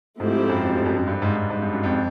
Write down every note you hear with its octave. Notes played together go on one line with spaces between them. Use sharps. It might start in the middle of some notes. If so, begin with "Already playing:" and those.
G#2 F3 A3 C4 E4 G4
F#2
F2
F2
F#2
F#2
G2
G#2
G#2
G#2
G2
F#2
F2